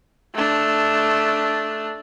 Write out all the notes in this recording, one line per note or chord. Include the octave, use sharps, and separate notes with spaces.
A3 D4